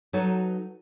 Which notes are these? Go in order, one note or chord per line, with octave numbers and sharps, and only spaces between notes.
F#3 D#4 F#4 A4 B4 C#5